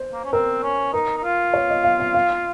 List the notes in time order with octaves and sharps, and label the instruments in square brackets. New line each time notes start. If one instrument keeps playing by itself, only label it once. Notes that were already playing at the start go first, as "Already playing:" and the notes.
Already playing: [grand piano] C5
[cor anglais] A#3
C#4
[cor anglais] C4 [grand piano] A#4
[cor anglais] C#4
[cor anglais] D#4 [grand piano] A#4
[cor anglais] D#4
F4
[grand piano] C#5
D#5
F5
F5
F5